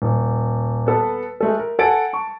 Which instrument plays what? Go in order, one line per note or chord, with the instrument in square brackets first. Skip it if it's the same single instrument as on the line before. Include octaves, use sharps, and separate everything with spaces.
[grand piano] D#1
B3 A4 B4
G#3 A3 A4
A#4
A4 F#5 G#5 A6 D7
A5 C#6